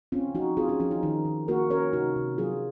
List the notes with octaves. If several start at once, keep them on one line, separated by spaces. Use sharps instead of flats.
C4 C#4 F4
F3 D#4 F#4
C4 F4 G#4
C#4 F4
F3 C#4 F4
D#4
D#3 D#4
D#3
A#3 F#4 A#4
C#4 A#4 C#5
C3 D#4 F#4
C3
F#3 F4 G#4